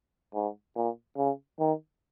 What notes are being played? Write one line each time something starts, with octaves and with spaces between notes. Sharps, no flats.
G#2
A#2
C#3
D#3